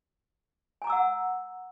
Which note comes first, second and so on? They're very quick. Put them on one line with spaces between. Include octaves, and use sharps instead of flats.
G#5 A#5 D6 E6 F#5